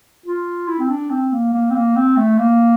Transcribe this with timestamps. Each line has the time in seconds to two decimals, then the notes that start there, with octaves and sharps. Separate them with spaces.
0.26 F4
0.68 E4
0.79 C4
0.89 D4
1.10 C4
1.33 A#3
1.53 A#3
1.71 C4
1.75 A#3
1.96 C4
2.17 A3
2.39 A#3